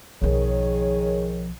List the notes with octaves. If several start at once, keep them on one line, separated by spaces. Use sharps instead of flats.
B1 D#3 F3 G#4 C#5